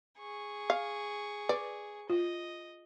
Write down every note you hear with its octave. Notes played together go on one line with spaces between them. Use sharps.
G#4 C#6
F5
B4 D5
F4 D#5